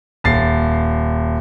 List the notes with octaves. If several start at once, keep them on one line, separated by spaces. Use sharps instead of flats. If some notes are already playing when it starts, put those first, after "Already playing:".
D#1 A6 C7